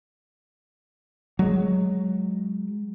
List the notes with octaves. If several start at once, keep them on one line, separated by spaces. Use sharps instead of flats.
F#3 G#3